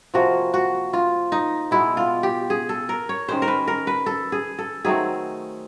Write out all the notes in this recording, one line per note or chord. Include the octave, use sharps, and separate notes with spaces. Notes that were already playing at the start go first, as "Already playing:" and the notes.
C3 F3 A#3 F#4
F#4
F4
D#4
B2 G#3 B3 E4
F4
G4
G#4
A4
A#4
C#5
D#3 G#3 C#4 C5
A#4
B4
A#4
B4
A4
G#4
A4
D#3 F#3 A3 C4 G#4